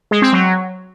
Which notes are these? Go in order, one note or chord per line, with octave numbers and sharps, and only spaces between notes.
G#3
C4
F#3